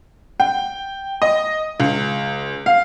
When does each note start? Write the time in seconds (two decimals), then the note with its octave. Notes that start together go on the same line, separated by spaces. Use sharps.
0.40 G5
1.22 D#5
1.80 C#2
2.66 F5